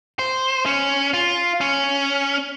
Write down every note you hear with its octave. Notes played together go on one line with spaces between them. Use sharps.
C5
C#4
F4
C#4